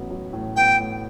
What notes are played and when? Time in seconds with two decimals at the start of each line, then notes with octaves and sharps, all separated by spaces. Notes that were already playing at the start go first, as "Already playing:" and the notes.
Already playing: A1 A2 F#3 B3
0.11 F#3
0.33 A2
0.56 B3 G5
0.80 A2